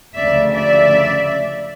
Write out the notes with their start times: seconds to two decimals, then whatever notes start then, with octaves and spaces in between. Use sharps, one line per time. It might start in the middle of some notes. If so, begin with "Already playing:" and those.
0.15 D2 C#3 F3 A3 D5 E5
0.51 D5 E5